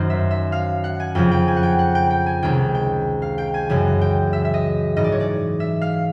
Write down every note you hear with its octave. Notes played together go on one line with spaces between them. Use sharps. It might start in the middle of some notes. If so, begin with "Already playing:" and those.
Already playing: F#2 D#3 C5
E5
E5
F5
F#5
G#5
F2 C#3 F3 G5
G5
G#5
F#5
G5
F#5
G5
G5
G#5
C#2 C3 D#3 G5
G5
F5
G5
G#5
F#2 C#3 E3 G#5
G5
E5
E5
D#5
G#2 E3 D#5
D5
C#5
D5
E5
F5